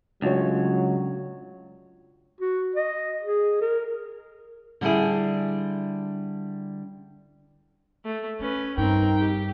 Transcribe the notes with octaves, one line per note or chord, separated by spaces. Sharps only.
C#2 F#3 A3 D4 F4 F#4 C#5
F#4
D#5
G#4
A#4
D3 G3 D4 E4 G#4
A3
A3 C#4 B4
G2 C4 D#4 A#4 G5
G4